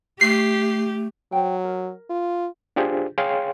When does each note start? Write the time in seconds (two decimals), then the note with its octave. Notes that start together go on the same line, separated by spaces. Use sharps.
0.21 A3 G4 C7
1.32 F#3 C5 G5
1.64 A#4
2.10 F4
2.76 D4 F4 G4 G#4 C5
3.18 G#4 C#5 F5 G5 C6